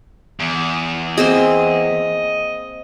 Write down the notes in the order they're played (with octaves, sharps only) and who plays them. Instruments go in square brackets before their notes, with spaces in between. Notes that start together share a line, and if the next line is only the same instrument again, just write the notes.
[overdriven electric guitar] E2
[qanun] A#3 C4 G#4 [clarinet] D#5